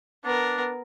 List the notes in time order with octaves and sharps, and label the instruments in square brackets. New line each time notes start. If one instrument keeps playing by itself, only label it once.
[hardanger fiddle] B3 A#4 [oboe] D4